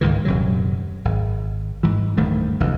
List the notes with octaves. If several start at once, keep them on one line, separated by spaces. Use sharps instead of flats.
C#2 G#2 D#3 E3
D#1 F#2 C3 F#3
G#1
G#2 E3
D1 G2 D#3 A3
F1 D2 E3